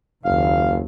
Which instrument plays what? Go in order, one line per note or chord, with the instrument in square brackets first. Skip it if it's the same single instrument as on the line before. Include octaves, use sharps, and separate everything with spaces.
[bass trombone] F#1 [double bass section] D#2 [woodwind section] F5